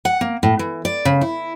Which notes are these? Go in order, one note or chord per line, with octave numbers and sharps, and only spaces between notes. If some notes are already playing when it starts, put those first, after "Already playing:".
F#5
A#3
A2
E3
D5
C#3
E4